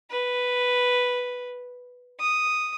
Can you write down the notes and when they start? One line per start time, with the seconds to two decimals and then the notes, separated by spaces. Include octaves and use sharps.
0.10 B4
2.20 D#6